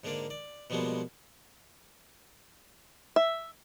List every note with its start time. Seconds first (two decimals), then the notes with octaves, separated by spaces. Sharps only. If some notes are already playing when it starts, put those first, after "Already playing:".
0.04 G#2 D3 A#3 D4 D5
0.30 D5
0.70 B2 F3 G3 G#3 A#3 B3
3.16 E5